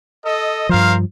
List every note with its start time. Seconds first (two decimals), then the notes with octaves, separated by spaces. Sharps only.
0.25 A4 D#5
0.69 G2 F3 A#4 C5 F5